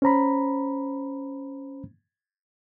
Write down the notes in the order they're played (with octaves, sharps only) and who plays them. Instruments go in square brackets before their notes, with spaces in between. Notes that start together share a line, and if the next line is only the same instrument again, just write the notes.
[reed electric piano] C#4 C5 A#5 B5